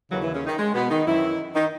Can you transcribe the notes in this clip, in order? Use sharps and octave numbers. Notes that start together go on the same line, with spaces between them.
D#2 C#3 E3 F#3 F#4
E3 E4
C#3 C#4
D#3 D#4
G#3
B2 B3
D#3 D#4
F#2 D#3 E3 E4
D#3 D#4